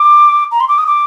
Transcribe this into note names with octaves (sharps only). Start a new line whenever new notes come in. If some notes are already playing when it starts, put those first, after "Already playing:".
Already playing: D6
A#5
C6
D6
D#6
D6